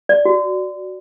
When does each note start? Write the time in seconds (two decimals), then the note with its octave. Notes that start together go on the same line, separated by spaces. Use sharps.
0.09 D5
0.25 F#4